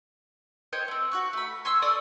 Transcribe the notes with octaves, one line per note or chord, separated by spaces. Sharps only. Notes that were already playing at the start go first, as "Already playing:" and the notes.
C5 C#5 D#5 G5
A3 C4
F#4 F#5 C#6
A3 B5
G#5 C6 C#6 E6
A4 D5 C#6 D#6